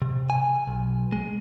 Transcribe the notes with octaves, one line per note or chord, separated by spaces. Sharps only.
C3
G#5
B1
G#3